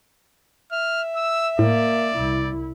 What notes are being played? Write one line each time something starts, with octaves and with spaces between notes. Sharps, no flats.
E5 F6
E6
A2 A#3 D5
C2 E4